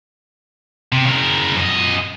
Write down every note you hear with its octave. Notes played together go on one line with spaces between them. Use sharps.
C3
C#3 A#4
F#2 D#5